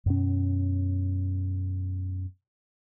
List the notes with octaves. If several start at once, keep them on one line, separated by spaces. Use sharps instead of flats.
F#2 B2 C#4